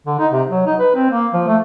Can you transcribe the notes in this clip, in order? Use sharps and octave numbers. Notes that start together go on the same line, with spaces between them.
D3
D#4
C3
F#3
D#4
B4
C4
A#3
F3
A3